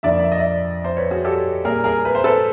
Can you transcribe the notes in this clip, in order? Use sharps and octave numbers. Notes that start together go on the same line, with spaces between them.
F2 D3 F3 A#3 D5 E5
E5
D#5
D5 E5
C5 D5
B4 C#5
F#4 G#4
G4 A4
A#2 G3 A#3 G#4 A#4
G#4 A#4
B4
C5
A4 B4